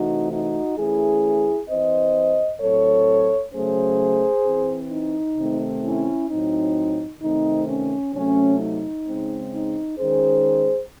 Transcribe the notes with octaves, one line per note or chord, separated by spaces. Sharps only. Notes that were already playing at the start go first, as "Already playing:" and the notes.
Already playing: C3 E3 A3 C4 D#4 F#4
D#4 F#4
E3 A3 C#4 E4 G#4
E3 C4 C5 D#5
A2 F#3 C4 A4 C#5
C#3 F#3 A3 C#4 G#4 C5
E3 C4
D#4
C3 D#3 A3 C4
C#4 E4
A2 F#3 C4 D#4
C3 D#3 A3 C4 D#4
C#4
C3 F#3 A3 C#4
D#4
C#3 G#3 C4
D#4
D#3 G#3 C#4 G#4 C5